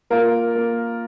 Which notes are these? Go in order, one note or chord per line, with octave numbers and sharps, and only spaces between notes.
A#3 F4 A#4
A#3